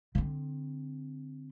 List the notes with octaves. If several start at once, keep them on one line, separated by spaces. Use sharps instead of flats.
D3 C4